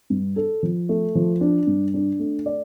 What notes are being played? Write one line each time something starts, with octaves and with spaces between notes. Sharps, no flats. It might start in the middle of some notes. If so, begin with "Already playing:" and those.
G2
A4
F3
A3
F3
D4
G2
D4
A3
D5